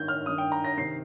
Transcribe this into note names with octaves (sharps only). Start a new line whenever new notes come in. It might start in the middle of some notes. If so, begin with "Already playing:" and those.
Already playing: G2 D#3 G6
F6
G2 D#3 D#6
G5
A#5
A#6
C3 D#3 C7